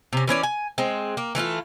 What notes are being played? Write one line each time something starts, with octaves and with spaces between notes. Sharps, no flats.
C3 C#4
E3 C#4 C#5 D5
G#5
G#3 C4
A#3
E3 A3 E4 F4